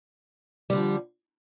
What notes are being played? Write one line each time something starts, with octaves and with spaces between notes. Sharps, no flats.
D3 F3 G3